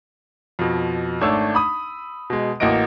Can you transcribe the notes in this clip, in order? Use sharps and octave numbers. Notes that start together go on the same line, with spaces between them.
F2 B2
G#1 A3 D4 C#5 E6
B5 D#6
B2 G#3
A1 A#3 F#4 D#5 D7